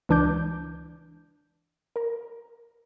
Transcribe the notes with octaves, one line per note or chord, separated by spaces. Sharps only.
C#2 E3 D4 D6 G6
A#4 A#5